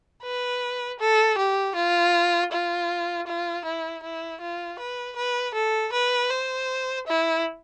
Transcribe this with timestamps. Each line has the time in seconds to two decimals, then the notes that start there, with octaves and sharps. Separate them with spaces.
0.23 B4
1.00 A4
1.38 G4
1.76 F4
2.52 F4
3.27 F4
3.65 E4
4.03 E4
4.41 F4
4.79 B4
5.17 B4
5.55 A4
5.93 B4
6.30 C5
7.07 E4